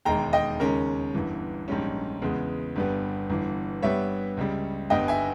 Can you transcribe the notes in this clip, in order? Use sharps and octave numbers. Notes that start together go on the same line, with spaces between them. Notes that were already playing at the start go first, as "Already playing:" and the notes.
E1 D#2 D#3 G#3 G5 A#5
D#5 G5
D#2 C#3 G#3 C#4 A#4
G1 G2 E3
A#1 G#2 G3 C#4
E2 C#3 G#3 B3
G1 G2 G3 B3
G1 G2 E3
G2 G3 B3 C#5 E5
C#2 C#3 G3
G1 G2 G3 B3 D#5 G5
E5 G#5